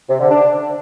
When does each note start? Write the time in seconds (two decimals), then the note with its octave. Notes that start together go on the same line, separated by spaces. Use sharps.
0.09 C3
0.20 D3
0.31 D4